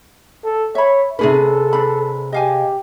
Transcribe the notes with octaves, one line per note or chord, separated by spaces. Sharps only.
A4
C#5 E5 B5
C3 C#4 D4 G#4 A4 B4
D4 B5
G4 D#5 F5 G#5